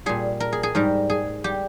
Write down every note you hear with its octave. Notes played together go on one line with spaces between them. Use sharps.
A#2 G3 G#4
A#4
G#4
G#4
G#2 G3 A#4
G#4
G3 G4